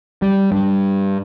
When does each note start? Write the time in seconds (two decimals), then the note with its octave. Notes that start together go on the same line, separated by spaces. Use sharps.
0.22 G3
0.52 G2